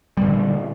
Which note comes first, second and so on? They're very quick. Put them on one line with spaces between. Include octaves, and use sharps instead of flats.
G3 A#2 D3